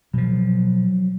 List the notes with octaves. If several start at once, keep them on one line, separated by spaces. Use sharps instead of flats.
B2 F3 F#3